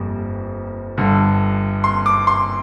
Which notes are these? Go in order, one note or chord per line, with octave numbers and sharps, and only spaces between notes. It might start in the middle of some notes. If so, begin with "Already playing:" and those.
Already playing: G1 F2 G3 A#3
G1 G2 D3
C6
D6
C6